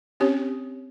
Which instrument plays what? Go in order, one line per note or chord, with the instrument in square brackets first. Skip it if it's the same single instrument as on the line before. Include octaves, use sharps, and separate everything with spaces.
[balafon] C4 C#4 G4 C#5